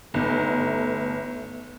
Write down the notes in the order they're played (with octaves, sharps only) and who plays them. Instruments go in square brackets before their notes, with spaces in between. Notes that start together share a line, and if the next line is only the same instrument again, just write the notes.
[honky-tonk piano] G1 [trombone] A3 [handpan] B3 D#4